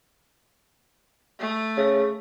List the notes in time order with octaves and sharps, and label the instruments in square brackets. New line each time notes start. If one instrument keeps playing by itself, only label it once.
[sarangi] A3
[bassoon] C#3